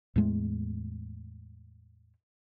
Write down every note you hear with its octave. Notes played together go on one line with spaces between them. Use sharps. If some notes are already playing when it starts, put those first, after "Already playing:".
E2 A2 G#3 A3